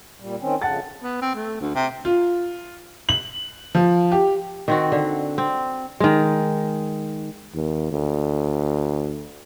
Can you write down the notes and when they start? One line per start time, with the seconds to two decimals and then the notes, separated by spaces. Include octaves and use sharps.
0.20 A#2 G3
0.40 D#3 C4 C#4
0.62 F2 C#3 F#5 A5 A6
1.03 B3
1.22 C4
1.35 A3
1.60 D2
1.75 C3
2.05 F4
3.09 F#7
3.75 F3
4.12 G4
4.68 D#3 C4 F#4
4.92 D3
5.38 C4
6.00 D#3 G#3
7.54 D#2
7.92 D2